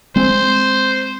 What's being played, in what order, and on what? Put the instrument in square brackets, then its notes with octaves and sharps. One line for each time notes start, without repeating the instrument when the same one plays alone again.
[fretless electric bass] G#3 C4 [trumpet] C5